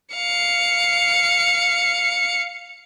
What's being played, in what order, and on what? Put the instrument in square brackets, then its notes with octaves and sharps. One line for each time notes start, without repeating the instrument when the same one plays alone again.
[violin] F5 C#7